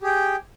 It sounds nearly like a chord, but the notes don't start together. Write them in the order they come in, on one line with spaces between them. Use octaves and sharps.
G4 G#4 G5